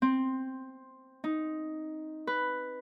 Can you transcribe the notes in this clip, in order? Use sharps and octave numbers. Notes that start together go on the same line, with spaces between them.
C4
D#4
B4